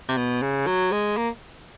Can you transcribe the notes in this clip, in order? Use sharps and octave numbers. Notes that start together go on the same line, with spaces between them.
C3
B2
C#3
F#3
G#3
A#3